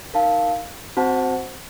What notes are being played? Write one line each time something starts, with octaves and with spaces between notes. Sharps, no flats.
D#4 A#4 F5 A5
C4 F#4 C5 F#5 A5